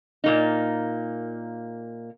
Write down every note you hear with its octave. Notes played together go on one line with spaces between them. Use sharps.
A#2 A#3 D#4